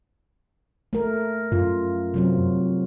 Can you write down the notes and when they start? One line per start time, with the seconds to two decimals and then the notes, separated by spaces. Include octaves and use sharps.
0.93 A3 A#4
1.52 F#2 F4
2.14 C3 F#3 C4